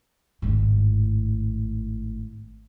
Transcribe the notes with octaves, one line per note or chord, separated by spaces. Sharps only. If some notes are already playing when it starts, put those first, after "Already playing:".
G#1 A2